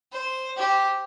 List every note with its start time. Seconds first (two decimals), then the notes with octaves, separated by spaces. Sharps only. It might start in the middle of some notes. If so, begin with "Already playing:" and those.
0.12 C5
0.57 G4 C5